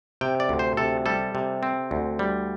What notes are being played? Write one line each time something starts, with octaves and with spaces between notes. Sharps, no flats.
C3 G5
D5
D2
C5
C3 A4
G3 A4
C3
C4
D2
G3